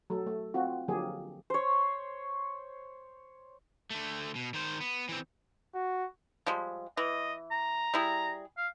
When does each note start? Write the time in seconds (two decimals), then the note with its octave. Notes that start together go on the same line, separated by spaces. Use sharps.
0.10 F#3 A3 A4
0.26 A3
0.54 C4 F4 F#4
0.88 D3 F3 F#3 A#3 G4 G#4
1.50 C5 C#5
3.90 D3 A3
4.35 B2
4.54 D#3 C5
4.81 B3
5.09 E3 C4
5.74 F#4
6.46 F3 G3 G#3
6.97 E3 D#5
7.51 A#5
7.94 G3 E4 G#4
8.58 F5